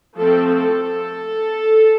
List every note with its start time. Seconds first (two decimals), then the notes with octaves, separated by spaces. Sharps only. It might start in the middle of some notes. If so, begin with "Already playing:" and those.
0.16 F3 A3 C4 A4
0.54 A4